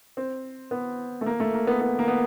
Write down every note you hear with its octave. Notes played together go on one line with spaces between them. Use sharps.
C4
B3
A3
A#3
A3
A#3
B3
B3
A#3
B3